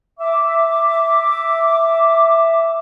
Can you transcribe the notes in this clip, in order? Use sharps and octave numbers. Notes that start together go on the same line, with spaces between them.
E5 D6